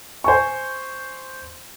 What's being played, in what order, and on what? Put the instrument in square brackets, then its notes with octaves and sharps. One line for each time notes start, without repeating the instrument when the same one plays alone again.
[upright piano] C5 G#5 C#6